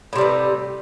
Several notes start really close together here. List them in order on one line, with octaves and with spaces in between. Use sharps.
A2 C3 G3 B3